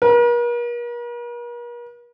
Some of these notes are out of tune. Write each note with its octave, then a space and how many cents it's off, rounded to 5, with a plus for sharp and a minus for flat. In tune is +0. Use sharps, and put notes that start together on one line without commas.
A#4 +45